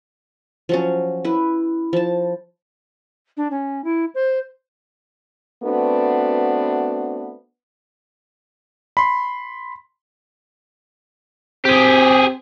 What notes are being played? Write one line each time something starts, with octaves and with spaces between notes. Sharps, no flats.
F3 F#3 C#4
E4 B4
F3 A5
D4
C#4
E4
C5
A3 B3 C4 D4 F#4 B4
B5 C6
C4 G4 G#4